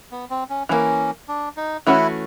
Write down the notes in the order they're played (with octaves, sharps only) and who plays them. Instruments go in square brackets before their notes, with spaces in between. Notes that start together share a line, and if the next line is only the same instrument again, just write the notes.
[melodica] B3
C4
C#4
[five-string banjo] E3 G3 A#3 [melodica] C#4
[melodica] D4
D#4
[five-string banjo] E3 A3 C#4 F#4 [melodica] E4